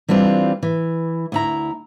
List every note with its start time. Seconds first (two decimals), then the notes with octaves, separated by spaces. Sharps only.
0.08 E3 G3 C4 D4 F4
0.63 E3
1.32 D2 E4 A#5